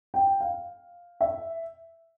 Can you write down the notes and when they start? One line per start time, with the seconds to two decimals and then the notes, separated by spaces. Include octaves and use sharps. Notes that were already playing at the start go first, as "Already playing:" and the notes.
0.14 G5
0.40 F5
1.21 E5